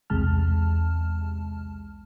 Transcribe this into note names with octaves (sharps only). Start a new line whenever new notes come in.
B1 E2 C3 G#3 A5 F6